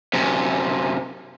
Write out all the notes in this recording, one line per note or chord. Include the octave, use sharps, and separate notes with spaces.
F#2 C3